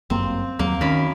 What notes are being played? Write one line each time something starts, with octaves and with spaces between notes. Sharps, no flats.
G1 F#2 A#3 C4
D#2 F#3 A#3
F#2 D#3 A#4 B5